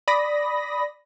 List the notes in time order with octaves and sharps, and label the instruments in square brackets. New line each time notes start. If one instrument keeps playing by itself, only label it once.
[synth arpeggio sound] D5 B5 D#6 A#6